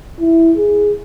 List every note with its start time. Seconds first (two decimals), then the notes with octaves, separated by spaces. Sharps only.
0.20 E4
0.57 G#4